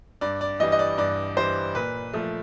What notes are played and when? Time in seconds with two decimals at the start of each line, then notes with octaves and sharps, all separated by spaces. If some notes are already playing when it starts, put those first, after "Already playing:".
0.21 G2 D5
0.41 D5
0.60 E3 G3 D#5
0.72 D#5
0.79 D5
0.98 G2 D5
1.37 E3 G3 C5
1.75 A#2 B4
2.13 F3 A3